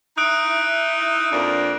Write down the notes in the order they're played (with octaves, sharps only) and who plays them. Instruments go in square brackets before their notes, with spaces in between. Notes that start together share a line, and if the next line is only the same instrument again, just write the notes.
[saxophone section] D#4 E4 [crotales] D#6 F#6 D7
[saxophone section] F2 A#3 D4